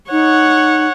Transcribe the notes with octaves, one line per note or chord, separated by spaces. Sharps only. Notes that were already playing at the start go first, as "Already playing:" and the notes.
D#4 C#5 F#5